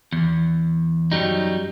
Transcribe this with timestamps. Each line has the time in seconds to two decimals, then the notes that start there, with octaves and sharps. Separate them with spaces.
0.13 E2
1.12 F#2 F#3 G3 D#4